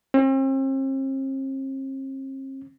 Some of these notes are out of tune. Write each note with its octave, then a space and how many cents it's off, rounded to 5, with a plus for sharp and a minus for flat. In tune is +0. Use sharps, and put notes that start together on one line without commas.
C4 +40